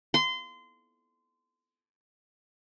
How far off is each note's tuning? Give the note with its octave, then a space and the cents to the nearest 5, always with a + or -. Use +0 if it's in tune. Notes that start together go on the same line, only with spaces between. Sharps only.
C6 -25